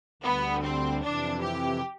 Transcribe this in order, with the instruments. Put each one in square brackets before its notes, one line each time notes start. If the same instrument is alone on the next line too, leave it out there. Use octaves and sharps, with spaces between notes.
[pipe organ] D2 D3 G3 [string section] B3
[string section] C4
[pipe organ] F2 C3 E3 [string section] D4
[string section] G4